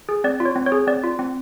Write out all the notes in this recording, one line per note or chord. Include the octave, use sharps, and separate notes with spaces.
G#4
C4 D5
F4
C#5
C4
C#5
G#4
C4 D5
F4
C4